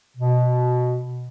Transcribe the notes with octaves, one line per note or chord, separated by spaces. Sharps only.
B2